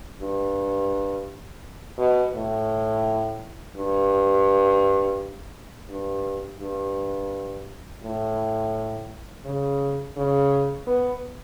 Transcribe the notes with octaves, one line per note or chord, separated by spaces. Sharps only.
G2
B2
A2
G2
G2
G2
A2
C#3
C#3
B3